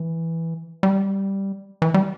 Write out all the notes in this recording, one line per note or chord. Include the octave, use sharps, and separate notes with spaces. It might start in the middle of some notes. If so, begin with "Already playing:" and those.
Already playing: E3
G3
E3
G3